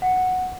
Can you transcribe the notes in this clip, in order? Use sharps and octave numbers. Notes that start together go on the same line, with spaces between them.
F#5